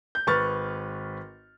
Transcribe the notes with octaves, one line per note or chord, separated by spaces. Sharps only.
G6
G#1 B4 C#6 F6 A6